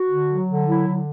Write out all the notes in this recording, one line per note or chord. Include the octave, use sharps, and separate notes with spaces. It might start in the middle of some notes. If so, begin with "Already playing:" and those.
Already playing: F#4
D3
F#3
D3
F#3 E4
D3